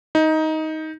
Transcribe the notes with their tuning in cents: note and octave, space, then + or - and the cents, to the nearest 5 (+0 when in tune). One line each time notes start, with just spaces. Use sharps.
D#4 +15